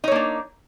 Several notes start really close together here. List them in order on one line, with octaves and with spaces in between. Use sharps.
D#4 C#5 A#3 D4